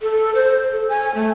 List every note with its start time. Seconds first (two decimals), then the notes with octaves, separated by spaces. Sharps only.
0.02 A4
0.35 C5
0.72 A4
0.89 G#5
1.15 A3